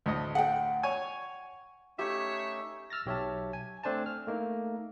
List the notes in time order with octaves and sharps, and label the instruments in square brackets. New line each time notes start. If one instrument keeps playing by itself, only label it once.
[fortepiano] D2 A2 D#5
[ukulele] F#5 G5
[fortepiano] C#5 G#5
[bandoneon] A3 C#4 D#4 [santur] G4 [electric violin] C#5 [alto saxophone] E5
[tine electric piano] E6 F6 A6 A#6
B1 G4 C#5 E5 A5
G#5
A3 C4 D4 C5 G#5 A5
F6
A3 A#3 D#4